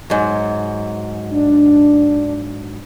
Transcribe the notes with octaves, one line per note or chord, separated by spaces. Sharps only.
G#2 F#3
D4